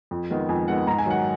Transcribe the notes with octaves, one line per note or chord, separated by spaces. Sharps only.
F2
D#3 G#3 B3
F2 G#5
D#3 G#3 B3 F#5
G#2 A#5
G#5
D#3 F#3 F#5